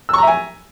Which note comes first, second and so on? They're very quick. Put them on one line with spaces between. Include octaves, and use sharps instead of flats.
E6 C#6 A#5 E5 G#5